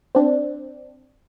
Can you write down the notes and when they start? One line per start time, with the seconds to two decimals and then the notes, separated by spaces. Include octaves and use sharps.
0.15 C4 D4